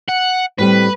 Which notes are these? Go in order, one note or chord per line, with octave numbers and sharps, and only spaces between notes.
F#5
A2 G3 C4 B4